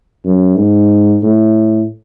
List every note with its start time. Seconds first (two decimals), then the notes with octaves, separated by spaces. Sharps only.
0.25 F#2
0.57 G#2
1.23 A2